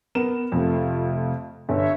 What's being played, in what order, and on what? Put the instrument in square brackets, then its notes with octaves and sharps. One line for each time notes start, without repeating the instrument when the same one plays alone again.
[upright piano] B3 A#4 E7
[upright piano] F2 [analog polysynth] C3 A3 F4
[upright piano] G1 [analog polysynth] C#5 E5